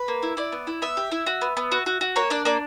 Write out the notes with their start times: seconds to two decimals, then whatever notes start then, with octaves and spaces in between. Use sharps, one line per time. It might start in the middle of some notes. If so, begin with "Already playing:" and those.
Already playing: B4
0.08 A#3
0.23 E4
0.37 E4 D5
0.52 B3
0.67 E4
0.82 B3 E5
0.97 G4
1.12 E4
1.26 F#4
1.41 B3
1.57 B3
1.72 F#4
1.86 F#4
2.01 F#4
2.16 A#3 C#5
2.30 D4 D5
2.45 A#3 D5